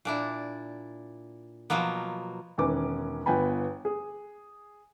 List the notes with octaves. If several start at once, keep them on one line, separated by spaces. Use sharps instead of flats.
A#2 D4 E4
B2 F3 F#3 A#3 B3
E1 D#3 C#4 B4 G#5 D6
G1 B3 G5 G#5 B5
G#4